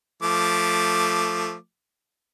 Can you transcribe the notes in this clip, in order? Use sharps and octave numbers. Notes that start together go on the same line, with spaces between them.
F3 A3 D6